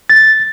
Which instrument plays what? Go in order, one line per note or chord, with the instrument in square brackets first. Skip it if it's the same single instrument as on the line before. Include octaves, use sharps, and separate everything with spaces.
[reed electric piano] A6